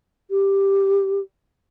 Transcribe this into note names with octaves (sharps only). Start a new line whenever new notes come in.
G4